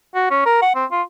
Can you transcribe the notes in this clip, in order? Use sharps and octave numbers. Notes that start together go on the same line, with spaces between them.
F#4
C#4
A#4
F#5
C4
F4